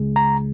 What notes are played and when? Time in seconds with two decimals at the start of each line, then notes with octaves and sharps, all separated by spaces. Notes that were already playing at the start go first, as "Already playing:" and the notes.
Already playing: C#2 C#3 G#3
0.16 A#5